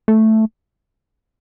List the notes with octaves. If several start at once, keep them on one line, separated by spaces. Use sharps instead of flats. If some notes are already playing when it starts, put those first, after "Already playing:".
A3